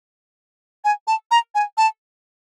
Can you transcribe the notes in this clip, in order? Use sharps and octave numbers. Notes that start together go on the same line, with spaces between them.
G#5
A5
A#5
G#5
A5